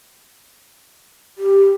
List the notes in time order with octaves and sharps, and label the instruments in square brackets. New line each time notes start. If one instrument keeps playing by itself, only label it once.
[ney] G4